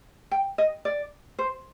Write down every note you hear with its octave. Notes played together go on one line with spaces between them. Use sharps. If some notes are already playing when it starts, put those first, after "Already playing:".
G5
D#5
D5
C5